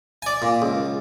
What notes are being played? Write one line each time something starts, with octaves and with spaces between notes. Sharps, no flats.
D5 G#5
A#2
C#2